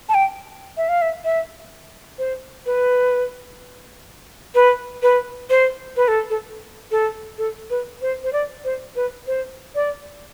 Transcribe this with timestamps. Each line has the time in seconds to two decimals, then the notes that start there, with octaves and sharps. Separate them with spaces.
0.09 A5
0.14 G5
0.77 E5
0.89 F5
1.02 E5
1.24 E5
2.18 C5
2.66 B4
4.55 B4
5.03 B4
5.50 C5
5.97 B4
6.08 A4
6.30 A4
6.91 A4
7.38 A4
7.70 B4
8.02 C5
8.24 C5
8.33 D5
8.65 C5
8.96 B4
9.27 C5
9.75 D5